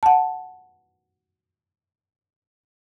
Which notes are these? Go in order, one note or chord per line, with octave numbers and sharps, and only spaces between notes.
F#5 A5